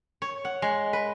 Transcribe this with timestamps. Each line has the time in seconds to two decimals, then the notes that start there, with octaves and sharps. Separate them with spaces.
0.22 C#5
0.45 F#5
0.62 G#3
0.93 B4